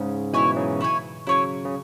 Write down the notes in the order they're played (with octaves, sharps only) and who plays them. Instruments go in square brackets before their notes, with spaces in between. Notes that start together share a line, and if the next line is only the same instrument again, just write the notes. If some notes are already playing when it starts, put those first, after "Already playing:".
Already playing: [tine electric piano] G#2 C#3
[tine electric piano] B2 E3 [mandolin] E4 C#5 G#5
[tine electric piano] C#3 F#3
[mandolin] E4 C#5 G#5
[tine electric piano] C#3 F#3 [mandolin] E4 C#5 G#5
[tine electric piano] C#3